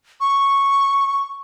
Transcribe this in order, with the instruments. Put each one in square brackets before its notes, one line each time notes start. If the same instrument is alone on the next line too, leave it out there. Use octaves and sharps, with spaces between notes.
[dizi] C#6